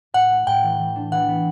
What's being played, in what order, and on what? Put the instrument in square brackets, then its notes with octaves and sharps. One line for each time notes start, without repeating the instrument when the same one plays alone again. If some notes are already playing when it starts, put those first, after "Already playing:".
[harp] A2 [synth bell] F#5
[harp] A3
[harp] A2 [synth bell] G5
[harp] E3
E3
D4
[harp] E3 [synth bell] F#5
[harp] B3